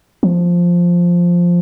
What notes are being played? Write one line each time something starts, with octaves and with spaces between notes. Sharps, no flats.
F3